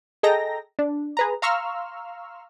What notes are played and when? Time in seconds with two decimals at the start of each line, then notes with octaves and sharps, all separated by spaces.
0.23 G#4 A4 D#5 G5 A#5 A#6
0.79 D4
1.17 G#4 B4 A#5
1.42 F5 A#5 C6 C#6 E6 F6